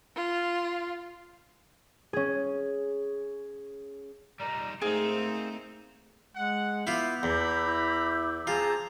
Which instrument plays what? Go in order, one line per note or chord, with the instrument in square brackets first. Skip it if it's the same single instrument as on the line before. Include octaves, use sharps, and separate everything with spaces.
[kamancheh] F4
[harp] C#4 G#4
[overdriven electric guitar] G3 D#4 [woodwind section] D5 A#5
[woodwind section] G#2 [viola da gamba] A3 D#4 [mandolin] A#3 G#4 F6 [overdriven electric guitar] C4
[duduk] G#3 [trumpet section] F#5
[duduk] B3 [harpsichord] E4 F4 [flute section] D6 E6 G6
[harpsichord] E2 [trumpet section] A#5 B5
[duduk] E4
[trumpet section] C4 A5 A#5 [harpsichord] F4 [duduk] G#4